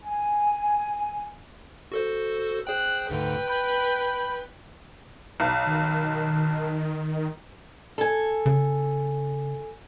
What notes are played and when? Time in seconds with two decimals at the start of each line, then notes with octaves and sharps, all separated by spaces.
0.03 G#5
1.92 F#4 A4 C5
2.67 G#4 C5 G5 F#6
3.10 D2 G#2 D3 B4 G5
3.48 B5 G6
5.40 B1
5.66 D#3
7.98 A4 G#5
8.46 C#3